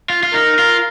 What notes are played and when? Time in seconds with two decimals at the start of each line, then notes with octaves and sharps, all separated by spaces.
0.10 F4
0.23 F4
0.33 D#4 A#4
0.59 F4